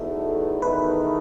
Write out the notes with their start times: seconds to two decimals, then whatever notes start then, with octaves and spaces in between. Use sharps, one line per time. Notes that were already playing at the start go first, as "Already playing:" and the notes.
Already playing: E2 B2 A3 D#4 A4
0.61 E2 D#3 A3 D#4 B4